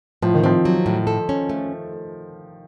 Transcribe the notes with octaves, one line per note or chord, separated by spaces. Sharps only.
A2 F3
D#3
F3 C4
F#3
A2
A4
C#4
A3